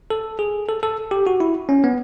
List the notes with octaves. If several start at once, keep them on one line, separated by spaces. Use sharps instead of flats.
A4
G#4
A4
A4
G4
F#4
E4
C#4
B3